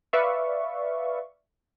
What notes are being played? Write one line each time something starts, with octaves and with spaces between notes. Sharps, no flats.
B4 D5 E5 F5 C#6